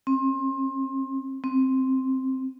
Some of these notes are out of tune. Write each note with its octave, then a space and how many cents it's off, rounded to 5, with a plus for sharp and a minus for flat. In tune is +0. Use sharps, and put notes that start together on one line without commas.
C4 +30
C4 +5